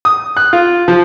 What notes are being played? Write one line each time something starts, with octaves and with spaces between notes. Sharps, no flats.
D#6
F#6
F4
F3